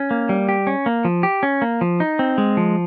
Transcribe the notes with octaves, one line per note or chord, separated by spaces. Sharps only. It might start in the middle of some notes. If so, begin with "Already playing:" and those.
Already playing: C#4
A#3
G3
G4
C#4
A#3
F3
G4
C#4
A#3
F3
D#4
C4
G#3
F3